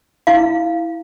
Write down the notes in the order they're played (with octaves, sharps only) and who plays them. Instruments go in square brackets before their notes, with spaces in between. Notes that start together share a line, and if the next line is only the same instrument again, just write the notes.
[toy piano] E4 F5